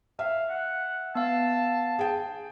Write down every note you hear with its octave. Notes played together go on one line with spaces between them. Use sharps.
E5 F5
F#5
B3 F5 A5
G#4 G5